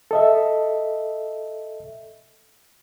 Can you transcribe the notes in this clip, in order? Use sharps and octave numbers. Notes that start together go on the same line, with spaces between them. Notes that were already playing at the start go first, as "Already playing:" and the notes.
A4 D#5 E5